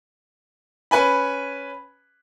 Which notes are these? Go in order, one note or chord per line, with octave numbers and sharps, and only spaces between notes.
C#4 B4 G#5 B5